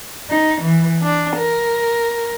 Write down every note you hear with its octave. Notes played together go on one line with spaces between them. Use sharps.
D#4
E3
D4
A#4